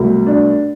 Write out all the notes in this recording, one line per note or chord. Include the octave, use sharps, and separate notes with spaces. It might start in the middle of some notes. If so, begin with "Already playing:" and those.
Already playing: C2 B2 F#3 A3
D4